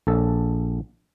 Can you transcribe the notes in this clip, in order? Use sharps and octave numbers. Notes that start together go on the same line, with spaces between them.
A#1 A4 A5